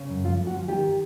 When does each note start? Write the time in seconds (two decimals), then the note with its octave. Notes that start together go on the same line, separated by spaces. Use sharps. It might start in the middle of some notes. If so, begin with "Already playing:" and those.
Already playing: C#3
0.09 F#2
0.24 F3 F4
0.39 D2
0.47 F#4
0.53 F3
0.68 D#3 G4
0.83 D#3